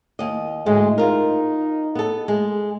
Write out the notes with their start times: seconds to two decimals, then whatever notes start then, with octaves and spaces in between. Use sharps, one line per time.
0.19 D#2 D#5
0.66 D2 G#2 G#3 A3
0.98 D#4 F4 A#4
1.95 B3 A4
2.28 G#3